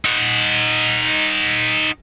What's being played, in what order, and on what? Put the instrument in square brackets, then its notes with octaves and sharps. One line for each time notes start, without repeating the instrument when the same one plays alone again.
[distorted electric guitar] D#4 F#5